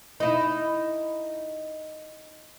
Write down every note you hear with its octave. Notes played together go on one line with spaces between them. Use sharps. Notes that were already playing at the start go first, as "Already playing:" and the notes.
D#4 E4